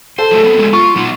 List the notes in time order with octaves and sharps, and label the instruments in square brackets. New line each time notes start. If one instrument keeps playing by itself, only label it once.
[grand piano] A4 [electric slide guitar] C5
[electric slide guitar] F#3 A3
B3 C4
F#3 G#3 A3
[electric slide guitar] F4 [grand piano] C#6
[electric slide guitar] F#3 B3 D#4